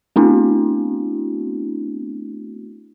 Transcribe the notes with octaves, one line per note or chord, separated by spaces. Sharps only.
A3 B3 C4 D4 E4 F#4